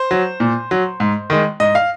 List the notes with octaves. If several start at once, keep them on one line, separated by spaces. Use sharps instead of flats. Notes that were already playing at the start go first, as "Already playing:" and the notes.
Already playing: C5
F#3
A#2
F#3
G#2
D#3 G#3
G#2 D#5
F5